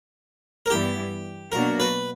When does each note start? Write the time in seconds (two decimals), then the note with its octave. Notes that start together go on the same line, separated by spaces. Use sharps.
0.66 A#4
0.70 G2 E3 G3 B3 E4 G4
1.52 B2 F#3 A#3 D4 F#4 A#4
1.80 B4